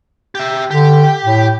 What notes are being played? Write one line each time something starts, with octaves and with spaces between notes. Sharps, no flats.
G4 E5
D3 G4
A2